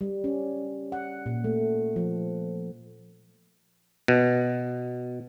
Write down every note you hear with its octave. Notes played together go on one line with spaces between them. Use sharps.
G3
C#4
F#5
A#2
A3
F3
B2